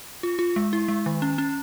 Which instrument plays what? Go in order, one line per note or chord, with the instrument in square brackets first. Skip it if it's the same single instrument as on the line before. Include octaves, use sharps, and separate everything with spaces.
[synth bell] F4
F4
G#3
E4
G#3
D#3
C#4
C#4